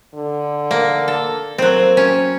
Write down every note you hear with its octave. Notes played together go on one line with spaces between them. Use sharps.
D3
A#3
A4
F#3 A#3 C4
C#4